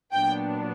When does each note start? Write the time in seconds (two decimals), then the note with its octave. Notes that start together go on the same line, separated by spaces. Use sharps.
0.13 A#2 F#3 B3 D4 G5